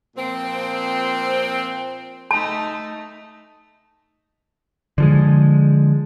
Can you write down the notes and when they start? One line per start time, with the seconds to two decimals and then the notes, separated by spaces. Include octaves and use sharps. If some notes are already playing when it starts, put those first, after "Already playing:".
0.17 A#2 F3 C4
2.31 A3 D#4 A5
4.98 D3 F3 G#3